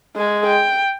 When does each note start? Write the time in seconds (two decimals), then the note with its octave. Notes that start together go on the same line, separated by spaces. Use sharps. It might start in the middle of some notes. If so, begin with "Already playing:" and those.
0.16 G#3 G#4
0.47 G5